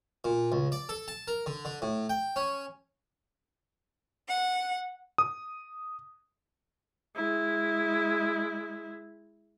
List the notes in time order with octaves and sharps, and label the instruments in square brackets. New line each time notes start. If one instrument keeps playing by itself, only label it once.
[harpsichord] A#2
C#2
D5
A4
A5
A#4
D3
D3
A2
G5
C#4
[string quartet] F#5
[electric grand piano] D#6
[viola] G#3 E4